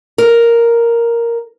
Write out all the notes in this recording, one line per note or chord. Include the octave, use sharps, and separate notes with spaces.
A#4